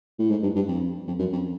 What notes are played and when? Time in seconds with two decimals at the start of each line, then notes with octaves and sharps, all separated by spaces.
0.19 A2
0.31 G#2
0.43 G2
0.56 G2
0.68 F2
1.07 F2
1.19 F#2
1.32 F2